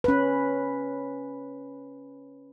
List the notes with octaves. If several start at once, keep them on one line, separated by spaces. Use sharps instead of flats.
C#4 B4